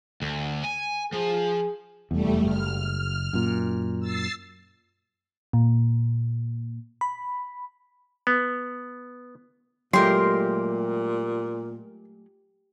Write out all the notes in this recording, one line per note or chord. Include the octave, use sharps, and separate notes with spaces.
D2
G#5
F3 G#4
F1 E2 G3 A3
F#1 F6
F#2 A#2
E6 A6 C7
A#2
B5
B3
A#2 F#3 G#3 A3 G4 A#4 C6